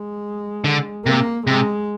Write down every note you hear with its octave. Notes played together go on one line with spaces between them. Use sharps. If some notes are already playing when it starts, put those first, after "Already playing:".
Already playing: G#3
D3
C3 A#3
C3 G#3